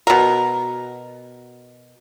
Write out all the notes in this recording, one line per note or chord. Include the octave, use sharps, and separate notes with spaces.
B2 A#4